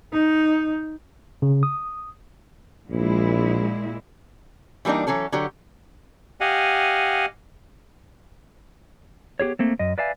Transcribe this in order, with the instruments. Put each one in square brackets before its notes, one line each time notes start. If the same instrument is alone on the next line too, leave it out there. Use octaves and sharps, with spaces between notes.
[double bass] D#4
[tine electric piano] C#3
D#6
[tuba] A#1 [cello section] A#2 G#3 E4
[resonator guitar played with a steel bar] E3 G3 A#3 D4 D#4
E3 F#3 C#4 A4
D3 F#3 G4
[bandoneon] G4 D#5 F5 F#5 G#5
[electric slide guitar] B3 G4 G#4 C#5
A3 A#3 C4
F#2 D#5
B4 D5 E5 F5 G#5